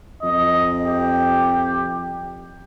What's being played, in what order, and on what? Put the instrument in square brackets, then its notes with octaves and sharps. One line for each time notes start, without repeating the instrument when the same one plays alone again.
[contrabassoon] F2 [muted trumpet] D#5
[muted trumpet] G4